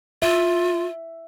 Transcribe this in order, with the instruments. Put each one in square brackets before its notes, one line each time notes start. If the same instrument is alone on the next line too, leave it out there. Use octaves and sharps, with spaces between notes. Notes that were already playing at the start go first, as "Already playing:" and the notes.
[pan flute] F4 [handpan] E5